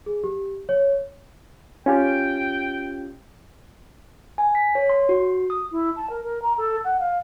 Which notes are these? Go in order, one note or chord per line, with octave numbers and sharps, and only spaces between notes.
G#4
G4
C#5
C#4 F4 G4 G5
G#5
B6
C#5
C6
F#4
D#6
E4
A5
A#4
A#4
A#5
A4
F#5
F5